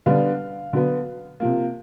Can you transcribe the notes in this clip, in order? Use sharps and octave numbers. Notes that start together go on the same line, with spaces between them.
D3 G3 B3 D4 F5
D3 F#3 B3
C3 F3 A#3